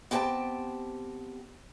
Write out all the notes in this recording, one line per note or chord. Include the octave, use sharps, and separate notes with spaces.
B3 C4 G4 E5 G5 A5